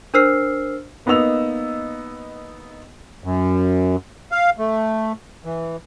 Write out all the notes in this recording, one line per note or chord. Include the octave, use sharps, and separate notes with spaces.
D4 A#4 C5 E6 F6 C7
A#3 B3 D#4 D#5 E6 F7
F#2
F5
A3
E3